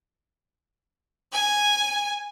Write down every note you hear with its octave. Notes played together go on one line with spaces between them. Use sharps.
G#5